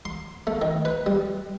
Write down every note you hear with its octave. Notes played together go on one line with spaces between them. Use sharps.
C6
A3
D#3
B4
G3